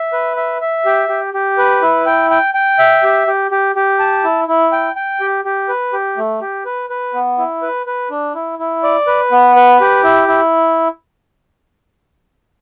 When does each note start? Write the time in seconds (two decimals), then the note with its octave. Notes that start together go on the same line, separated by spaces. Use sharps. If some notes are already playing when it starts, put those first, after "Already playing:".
Already playing: E5
0.13 B4
0.37 E5
0.61 E5
0.85 G4
1.09 G4
1.34 G4
1.58 B4
1.82 E4
2.06 G5
2.30 G5
2.54 G5
2.79 E5
3.03 G4
3.27 G4
3.51 G4
3.75 G4
3.99 A5
4.24 E4
4.48 E4
4.72 G5
4.96 G5
5.20 G4
5.45 G4
5.68 B4
5.93 G4
6.17 A3
6.41 G4
6.65 B4
6.90 B4
7.14 B3
7.38 E4
7.62 B4
7.86 B4
8.10 D4
8.35 E4
8.59 E4
8.83 D5
9.07 B4
9.32 B3
9.56 B4
9.80 G4
10.04 E4
10.28 E4